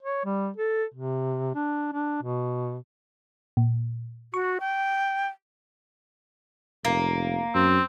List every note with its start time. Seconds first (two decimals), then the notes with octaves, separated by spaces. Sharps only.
0.02 C#5
0.25 G3
0.57 A4
0.94 C3
1.55 D4
1.93 D4
2.23 B2
3.57 A#2
4.34 F#4 C#6
4.60 G5
6.85 F1 A#3
7.54 F#2 C4